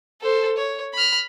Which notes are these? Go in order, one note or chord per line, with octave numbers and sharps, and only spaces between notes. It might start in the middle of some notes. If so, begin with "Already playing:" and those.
A4 C5
C#5
B5 F6